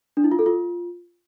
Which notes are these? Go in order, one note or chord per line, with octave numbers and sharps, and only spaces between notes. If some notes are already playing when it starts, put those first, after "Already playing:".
D4
E4
F4
A4
F4